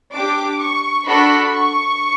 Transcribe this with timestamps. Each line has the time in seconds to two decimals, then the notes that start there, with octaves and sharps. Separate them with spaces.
0.12 D4 G4 D6
0.60 C#6
1.05 D4 F#4 A4 B5
1.52 C#6